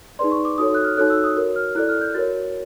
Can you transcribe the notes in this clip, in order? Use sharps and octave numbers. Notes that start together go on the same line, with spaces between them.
D#4 G#4 B4 D5 C6
C#6
D6
D#4 F#4 A4 C#5 D#6
F#6
F6
D#4 F#4 A4 C#5 F#6
E6
D#6
F#4 A#4 C#5
F6
E4 A4 D5 F#6
F6
G6
F#4 A#4 C#5 A6